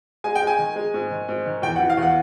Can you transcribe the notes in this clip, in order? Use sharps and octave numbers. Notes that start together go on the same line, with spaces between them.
G#3 G#5
G5
G#3
G#5
D#3
G#3
G#2
D#3
G#2
D#3
E2 G5
E3 F#5
F5
E2
F#5